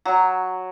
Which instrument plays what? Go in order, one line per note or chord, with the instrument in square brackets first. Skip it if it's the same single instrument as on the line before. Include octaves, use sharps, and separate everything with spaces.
[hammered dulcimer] F#3